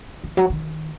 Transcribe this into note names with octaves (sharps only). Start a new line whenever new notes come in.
D#3
F#3
D#3